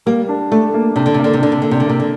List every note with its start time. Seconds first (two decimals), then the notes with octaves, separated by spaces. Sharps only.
0.06 G3 A#3
0.29 D4
0.51 A3 D4
0.74 A#3
0.96 C3 D4
1.06 D3
1.14 C3
1.19 A#3
1.24 D3
1.33 C3
1.41 D3 D4
1.52 C3
1.62 D3 A#3
1.71 C3
1.80 D3
1.86 C3 A#3
2.00 D3